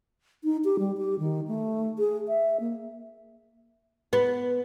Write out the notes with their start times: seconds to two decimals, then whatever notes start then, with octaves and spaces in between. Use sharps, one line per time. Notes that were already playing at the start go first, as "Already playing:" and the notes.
0.44 D#4
0.65 G4
0.79 G3
0.98 G4
1.19 D#3
1.48 A3
1.99 G#4
2.28 E5
2.60 A#3
4.13 B3